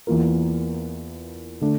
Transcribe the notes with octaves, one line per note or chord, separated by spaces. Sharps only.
E2 E3 A#3 F4 A#4
D3 A3 D4